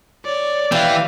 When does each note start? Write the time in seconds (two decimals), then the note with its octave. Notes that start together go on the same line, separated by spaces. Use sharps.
0.25 C#5 D5
0.72 E3 G4 F5